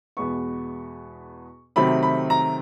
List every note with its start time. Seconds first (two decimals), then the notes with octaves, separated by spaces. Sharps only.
0.17 E2 B2 G#3 B3 C#6
1.76 C3 D#3 F#3 A3 C4 B5
2.03 B5
2.30 A#5